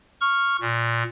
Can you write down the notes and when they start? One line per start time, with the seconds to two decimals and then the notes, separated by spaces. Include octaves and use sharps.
0.21 C#6 F6
0.61 A#2